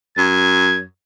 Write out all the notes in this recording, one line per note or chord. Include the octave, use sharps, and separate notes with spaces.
F#2 G#6